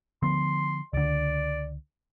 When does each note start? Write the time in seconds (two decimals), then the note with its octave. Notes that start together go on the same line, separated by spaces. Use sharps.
0.23 D3 F3 B3 C6
0.93 C#2 D3 D5